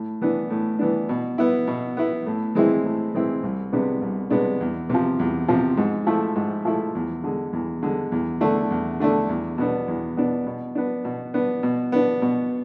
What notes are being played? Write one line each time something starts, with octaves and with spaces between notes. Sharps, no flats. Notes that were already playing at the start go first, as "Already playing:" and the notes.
Already playing: A2
E3 B3 D4
A2
E3 B3 D4
B2
B3 E4
B2
B3 E4
A2
E3 G#3 C4 E4
A2
E3 G#3 C4 E4
C2
C3 G#3 B3 D4
C2
C3 G#3 B3 D4
E2
C3 F3
E2
C3 F3
G#2
F3 A3 E4
G#2
F3 A3 E4
E2
D3 G#3
E2
D3 G#3
E2
D3 A3 D4
E2
D3 A3 D4
E2
B2 B3 D4
E2
B2 B3 D4
B2
B3 D4
B2
B3 D4
B2
B3 D4
B2